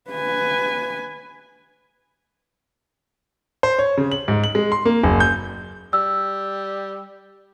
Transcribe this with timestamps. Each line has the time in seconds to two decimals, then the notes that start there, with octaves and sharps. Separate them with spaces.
0.11 B4 G#5
3.63 C5
3.79 C#5
3.98 C#3
4.12 F#7
4.28 G#2
4.44 F#7
4.55 G#3
4.72 C6
4.85 A#3
5.03 F#1
5.20 G6
5.93 G3 E6